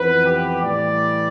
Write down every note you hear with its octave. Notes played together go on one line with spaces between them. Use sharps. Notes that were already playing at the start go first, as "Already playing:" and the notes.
Already playing: F2 E3 B3 B4
G4
A2 E3 G3 D5